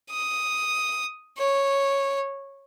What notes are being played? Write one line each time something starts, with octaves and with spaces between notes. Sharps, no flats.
D#6
C#5